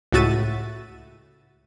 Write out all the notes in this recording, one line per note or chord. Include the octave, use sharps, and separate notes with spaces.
C#2 A2 F#4 E5 A6 D#7